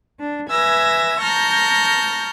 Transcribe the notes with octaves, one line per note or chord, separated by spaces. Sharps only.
D4
B4 E5 G#5 E6 G#6 A#6
A5 A#5 C#6 F6 G6 A#6